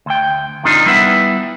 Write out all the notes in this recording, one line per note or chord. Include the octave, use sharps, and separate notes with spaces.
D2 G5
F2 C3 D#3 D4 D#4 F4
G3 B3 E4 B4 E5 F#5